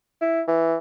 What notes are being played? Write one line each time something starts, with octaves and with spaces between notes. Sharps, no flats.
E4
E3